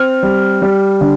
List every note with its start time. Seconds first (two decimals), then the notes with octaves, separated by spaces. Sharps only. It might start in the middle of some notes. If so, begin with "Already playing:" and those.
Already playing: C4 F6
0.23 G3
0.62 G3
1.01 D3